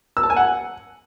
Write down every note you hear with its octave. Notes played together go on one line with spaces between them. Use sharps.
E6
A5
G#5
F#5